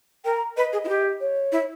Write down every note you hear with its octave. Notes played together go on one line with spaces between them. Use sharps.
A#4 G5
A#5
B4 D#5
G#4
E4
G4
C#5
E4